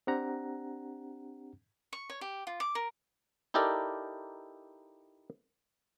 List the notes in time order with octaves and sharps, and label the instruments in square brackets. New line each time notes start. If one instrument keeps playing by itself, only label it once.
[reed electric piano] C4 D4 G4 F#5 A#5
[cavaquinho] C#6
C#5
G4
F4
D6
A#4
[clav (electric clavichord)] D#4 E4 G4 A4 A#4 D5